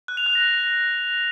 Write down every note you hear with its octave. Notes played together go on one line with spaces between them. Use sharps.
F#6
F7
F#6
A#6